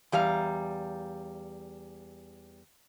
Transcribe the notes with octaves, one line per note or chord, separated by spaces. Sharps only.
E2 G3 F5 A#5